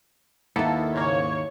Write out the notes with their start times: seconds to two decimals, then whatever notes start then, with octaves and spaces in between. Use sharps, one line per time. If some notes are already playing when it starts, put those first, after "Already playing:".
0.56 D#2 A#3 B3 E4 A4
0.95 G#2 C#3 A#3 C#5